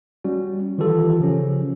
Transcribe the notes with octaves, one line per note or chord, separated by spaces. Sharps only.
G3 C#4 F#4
D#3 E3 F4 G4 A4
C#3 F3 C#4